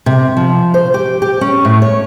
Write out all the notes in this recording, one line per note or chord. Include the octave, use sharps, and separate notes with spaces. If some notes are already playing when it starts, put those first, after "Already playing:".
C3
F3
C5
G4
G4
C#4
A2
C#5